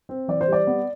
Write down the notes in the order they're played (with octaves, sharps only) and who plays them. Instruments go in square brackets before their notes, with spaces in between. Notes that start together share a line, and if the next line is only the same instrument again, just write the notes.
[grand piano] C4
E3 D5
C5
G3 D5
B3